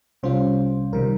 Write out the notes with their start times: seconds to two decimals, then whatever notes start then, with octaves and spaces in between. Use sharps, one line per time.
0.23 C2 C3 G3 C#4 F4 C5
0.92 C2 C3 D#3 G3 A#4